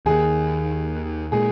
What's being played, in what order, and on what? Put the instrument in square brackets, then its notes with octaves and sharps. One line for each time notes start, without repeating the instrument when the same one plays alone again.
[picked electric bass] D#2 D#3 A#3 [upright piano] G#4
[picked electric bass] A#2 G#3 [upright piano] G#4